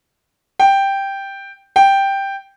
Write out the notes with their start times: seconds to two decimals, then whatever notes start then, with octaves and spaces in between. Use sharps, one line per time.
0.59 G5
1.76 G5